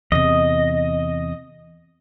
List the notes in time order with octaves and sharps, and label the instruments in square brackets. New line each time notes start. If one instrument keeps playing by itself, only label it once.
[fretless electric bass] E2 C3 [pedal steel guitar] D#5